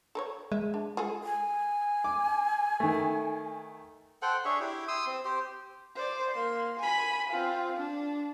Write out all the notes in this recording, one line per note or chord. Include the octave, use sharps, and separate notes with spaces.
A4 A#4 C#5
G#3 E5
D4
F4 G#4 A4
G#5
D6
D#3 A3
A4 C5 F#5 G5
D4 G#4 C#5 E5
E4 G4
C6 D#6 E6
C4
G4 C5
C5 D5
A#3 C6
G#5 B5
C4 F4
D4